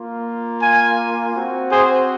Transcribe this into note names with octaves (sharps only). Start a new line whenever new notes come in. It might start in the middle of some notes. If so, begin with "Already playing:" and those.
Already playing: A#3 F4
F5 G#5
C4 F#4
G#4 C5